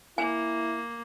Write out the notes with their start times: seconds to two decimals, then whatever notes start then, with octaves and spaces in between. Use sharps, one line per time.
0.18 A#3 E4 G#5